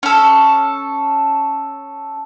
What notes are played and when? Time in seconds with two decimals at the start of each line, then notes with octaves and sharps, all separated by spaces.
0.03 C#4 A4